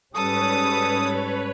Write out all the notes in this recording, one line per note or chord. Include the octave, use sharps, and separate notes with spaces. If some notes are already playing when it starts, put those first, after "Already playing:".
G#2 G3 C#4 A4 B4 C#5 D#6